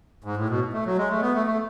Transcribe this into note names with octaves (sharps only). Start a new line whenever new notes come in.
G#2
A2
B2
A3
F#3
G#3
A3
B3
A3
A3